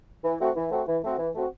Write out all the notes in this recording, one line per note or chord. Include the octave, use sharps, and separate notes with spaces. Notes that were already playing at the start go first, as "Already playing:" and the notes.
E3
A3 C4 F#4
E3
A3 C4 F#4
E3
A3 C4 F#4
E3
A3 C4 F#4